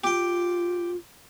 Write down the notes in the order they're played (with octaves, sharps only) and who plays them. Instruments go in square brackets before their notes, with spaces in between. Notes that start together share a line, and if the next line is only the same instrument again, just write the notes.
[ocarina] F4 [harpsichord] G4 G5